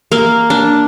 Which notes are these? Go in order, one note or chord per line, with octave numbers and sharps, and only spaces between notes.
A#3
D4